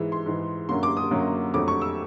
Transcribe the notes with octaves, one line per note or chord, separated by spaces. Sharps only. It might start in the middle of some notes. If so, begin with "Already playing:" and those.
Already playing: G#2 E3 G#3
C6
G#2 E3 G#3
F#2 D3 F#3 A#3 C6
D6
D#6
F#2 D3 F#3 A#3
F2 D3 F#3 A3 D6
C#6
E6